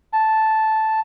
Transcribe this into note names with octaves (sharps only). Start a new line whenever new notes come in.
A5